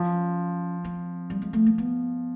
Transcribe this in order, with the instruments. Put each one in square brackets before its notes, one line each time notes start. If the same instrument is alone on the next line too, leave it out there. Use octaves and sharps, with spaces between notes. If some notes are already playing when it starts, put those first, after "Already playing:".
Already playing: [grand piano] F3 [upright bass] C#4
[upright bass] C4
G3
G#3
A3
A#3
B3